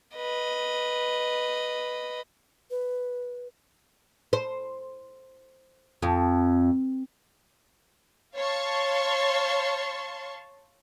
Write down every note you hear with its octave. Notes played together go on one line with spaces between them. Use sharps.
B4 D#5
B4
C5
F2
C#5 F5 A5 C6 C#6